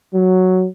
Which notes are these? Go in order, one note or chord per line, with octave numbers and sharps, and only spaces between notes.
F#3